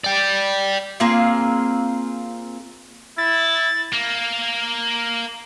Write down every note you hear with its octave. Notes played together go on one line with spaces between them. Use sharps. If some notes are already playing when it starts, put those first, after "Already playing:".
D5 G5
A#3 C4 F4 G#4
E4 A6
A#3